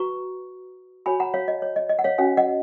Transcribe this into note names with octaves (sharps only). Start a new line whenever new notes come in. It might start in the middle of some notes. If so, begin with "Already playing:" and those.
Already playing: F#4 B4 A#5 C#6
F#4 C#5 G#5 B5
F#5 A#5
C#5 F5
D#5
C#5
D#5
D#5
F#5
C#5 F5
C#4 F#4 C#5 F5 G#5
D#5 F#5